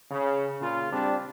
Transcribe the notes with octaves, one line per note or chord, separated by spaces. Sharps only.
C#3
A#2 C#3 F4
G3 C4 D4